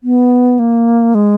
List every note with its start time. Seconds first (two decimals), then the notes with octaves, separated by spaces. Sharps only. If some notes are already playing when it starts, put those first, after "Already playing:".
0.04 B3
0.59 A#3
1.15 G#3